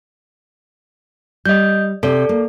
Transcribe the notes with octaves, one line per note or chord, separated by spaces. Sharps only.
G3 D#5 G6
C3 A4 D5
A#3